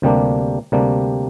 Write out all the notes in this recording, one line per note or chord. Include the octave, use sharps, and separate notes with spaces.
D2 C3 G3 A#3 D4
D2 C3 G3 A#3 D4